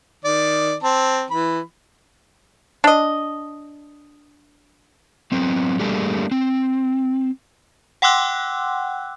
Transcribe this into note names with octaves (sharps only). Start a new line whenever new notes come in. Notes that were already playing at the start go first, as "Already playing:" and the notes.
D#3 D5
C4 A5
E3 B5
D4 D#5
F#3 B3 C4
G3 A3 A#3 D4 G4 G#4
C4
F#5 G5 C6 D6 E6 F#6